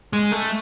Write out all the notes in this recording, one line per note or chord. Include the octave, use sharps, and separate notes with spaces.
G#3
A3